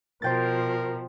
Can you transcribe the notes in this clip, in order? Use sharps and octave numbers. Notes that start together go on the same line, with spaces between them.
B2 F3 A#4 C5 G5 A6